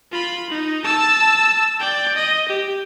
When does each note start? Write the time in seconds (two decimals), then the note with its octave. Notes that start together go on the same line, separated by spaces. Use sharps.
0.12 F4 B5
0.50 D#4
0.84 A5 E6
1.80 D5 G5
2.15 D#5
2.49 G4